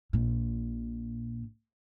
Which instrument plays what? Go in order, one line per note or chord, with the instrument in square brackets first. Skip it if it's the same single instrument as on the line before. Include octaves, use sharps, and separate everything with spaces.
[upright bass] A#1 A#2